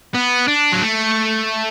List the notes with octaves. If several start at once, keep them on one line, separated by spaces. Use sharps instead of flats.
B3
D4
F#3
A3